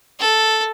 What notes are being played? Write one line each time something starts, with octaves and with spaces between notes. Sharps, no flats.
A4